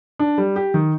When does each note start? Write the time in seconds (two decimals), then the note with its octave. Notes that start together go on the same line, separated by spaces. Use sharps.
0.19 D4
0.38 G3
0.56 G4
0.74 D#3